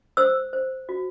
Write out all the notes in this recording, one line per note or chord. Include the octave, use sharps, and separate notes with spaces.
C5 E6
C5
F#4